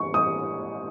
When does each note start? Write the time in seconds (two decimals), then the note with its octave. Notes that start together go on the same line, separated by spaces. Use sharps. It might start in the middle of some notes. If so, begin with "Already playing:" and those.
Already playing: C#6
0.14 D#6